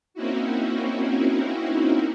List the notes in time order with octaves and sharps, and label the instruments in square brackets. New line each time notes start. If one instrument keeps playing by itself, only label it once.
[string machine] A#3 C4 C#4 D#4 E4 F#4